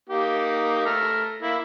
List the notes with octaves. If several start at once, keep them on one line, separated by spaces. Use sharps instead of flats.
A#3 D#4 G4
A3 A#5 F6
A#3 E4